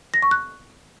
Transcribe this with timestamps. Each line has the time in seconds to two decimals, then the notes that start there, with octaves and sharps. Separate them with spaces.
0.14 A#6
0.22 C#6
0.31 F#6